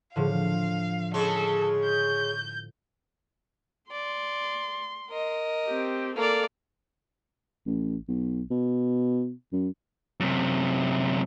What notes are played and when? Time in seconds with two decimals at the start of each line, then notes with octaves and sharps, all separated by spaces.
0.16 A2 D3 F3 F5
1.14 C#3 G#3 A4
1.85 G6
3.91 D5 C6
5.10 A#4 D#5
5.67 C4 G4
6.16 A#3 A4 D5 F5
7.66 A1
8.08 B1
8.51 B2
9.53 F#2
10.20 F#2 C3